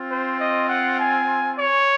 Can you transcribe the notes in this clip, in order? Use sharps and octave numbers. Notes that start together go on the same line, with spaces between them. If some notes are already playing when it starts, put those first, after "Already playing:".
Already playing: C4 F4
C5
D#5
F#5
G#5
C#5